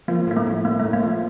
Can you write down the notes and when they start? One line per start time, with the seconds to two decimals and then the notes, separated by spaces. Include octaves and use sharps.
0.08 F3 A#3
0.27 A2 A#3
0.37 A3
0.46 A2
0.65 A2 A#3
0.80 A3
0.84 A2
0.93 A#3
1.03 F3